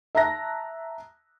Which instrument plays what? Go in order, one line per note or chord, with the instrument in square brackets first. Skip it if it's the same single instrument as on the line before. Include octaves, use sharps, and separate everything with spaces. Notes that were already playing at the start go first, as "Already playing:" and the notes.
[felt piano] E5 A5 A#5 F#6 A#6